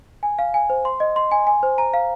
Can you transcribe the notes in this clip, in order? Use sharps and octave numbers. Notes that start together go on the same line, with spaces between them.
G#5
F5
G#5
C5
C6
D#5
C6
G#5
G#5
C5
A#5
F5